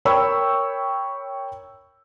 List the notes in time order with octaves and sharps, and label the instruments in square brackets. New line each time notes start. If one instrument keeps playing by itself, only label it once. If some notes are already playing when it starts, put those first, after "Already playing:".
[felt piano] A#4 C#5 G5 B5 C#6 E6